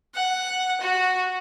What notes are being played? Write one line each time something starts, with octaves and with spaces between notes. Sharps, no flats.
F#5
F#4